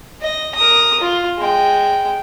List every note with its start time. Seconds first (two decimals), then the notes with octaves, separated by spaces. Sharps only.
0.22 D#5
0.55 A#4 D#6
1.00 F4
1.39 G#3 G5